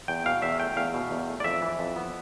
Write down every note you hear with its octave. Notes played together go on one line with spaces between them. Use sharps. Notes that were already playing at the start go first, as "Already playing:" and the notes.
E2 G5
B2 F5
E2 E5
A3 G5
E2 F5
B2
E2
A3
D5
F2 E5
E3
F2
B3